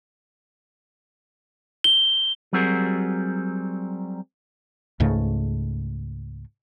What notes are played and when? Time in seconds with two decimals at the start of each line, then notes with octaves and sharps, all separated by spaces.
1.84 G7
2.53 F#3 G3 C4 F#4 G#4 A#4
5.00 C#2 G#2 C#3 A3